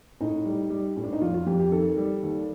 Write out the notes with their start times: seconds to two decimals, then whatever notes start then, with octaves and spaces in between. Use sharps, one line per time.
0.20 A2 D#4
0.45 G3
0.70 G3
0.96 A2
1.04 D4
1.13 D#4
1.21 F2 F4
1.34 F4
1.46 F2 G4
1.60 G4
1.71 D#3 A4
1.97 G3
2.23 D#2